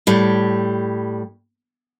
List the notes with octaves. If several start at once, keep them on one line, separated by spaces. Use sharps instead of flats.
A2 G3